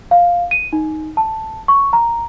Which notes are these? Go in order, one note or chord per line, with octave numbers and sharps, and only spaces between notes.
F5
D#7
D#4
A5
C#6
A#5